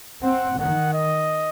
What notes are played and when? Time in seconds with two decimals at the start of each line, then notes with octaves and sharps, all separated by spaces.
0.22 C4 F#5
0.58 D#3 F#5
0.94 D#5